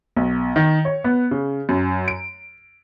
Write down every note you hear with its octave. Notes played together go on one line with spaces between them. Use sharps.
B1
D#3
C#5
B3
C#3
F#2
D7